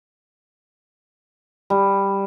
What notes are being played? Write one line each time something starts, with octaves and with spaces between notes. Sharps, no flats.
G3